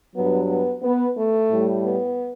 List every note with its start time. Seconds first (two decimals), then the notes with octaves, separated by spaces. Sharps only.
0.15 G2 F#3 B3
0.49 B3
0.83 B3
1.16 A3
1.50 A2 G3
1.84 B3